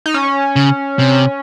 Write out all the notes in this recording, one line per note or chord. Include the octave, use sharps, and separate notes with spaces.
D#4
C#4
C#3
C3